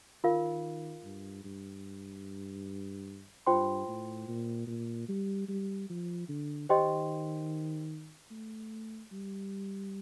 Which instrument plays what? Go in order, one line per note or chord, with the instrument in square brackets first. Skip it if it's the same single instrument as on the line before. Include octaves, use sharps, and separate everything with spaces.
[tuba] D#3 [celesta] F4 A#4 F5
[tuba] G2
G2
[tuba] G2 [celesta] F4 C5 G5 C6
[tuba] A2
A#2
A#2
G3
G3
F3
D3
[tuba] D#3 [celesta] G4 C5 D#5 G5 C6
[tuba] A3
G3